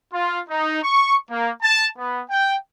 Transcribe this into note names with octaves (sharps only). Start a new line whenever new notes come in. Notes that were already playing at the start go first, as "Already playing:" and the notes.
F4
D#4
C#6
A#3
A5
B3
G5